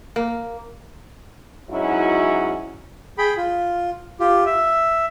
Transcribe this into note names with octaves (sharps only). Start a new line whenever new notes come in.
A#3
G#2 F#3 C#4 D#4 E4 F#4
G#4 G5 B5
F4
F4 G4
E5